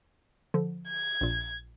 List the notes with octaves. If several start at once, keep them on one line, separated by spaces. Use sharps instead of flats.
D3 F3
G#6
A#1 A#2